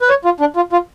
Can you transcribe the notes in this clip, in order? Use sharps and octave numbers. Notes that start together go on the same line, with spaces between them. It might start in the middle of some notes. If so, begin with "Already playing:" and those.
B4
C#5
F4
D4
F4
F4